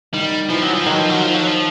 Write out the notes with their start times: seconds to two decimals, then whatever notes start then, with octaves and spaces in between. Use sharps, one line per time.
0.13 D#3 G3
0.49 E3 F3
0.62 F#3
0.73 F3
0.86 D#3 F#3
0.98 F3
1.10 F#3
1.23 F3
1.34 F#3
1.47 F3